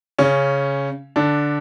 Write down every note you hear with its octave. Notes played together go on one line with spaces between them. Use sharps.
C#3 C#4
D3 D4